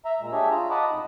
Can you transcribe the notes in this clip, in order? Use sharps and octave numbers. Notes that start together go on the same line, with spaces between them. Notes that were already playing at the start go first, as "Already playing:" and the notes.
E5 A#5
A#2 G#3
D4 G4 G#4 C#5 E5
F4 A#5
D#5 F#5 A5 B5 D6 D#6
F2 D#4